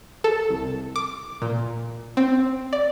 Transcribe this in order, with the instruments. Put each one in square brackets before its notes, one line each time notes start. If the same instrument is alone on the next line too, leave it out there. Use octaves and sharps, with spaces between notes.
[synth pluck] A4
C2
D6
A#2
C4
D5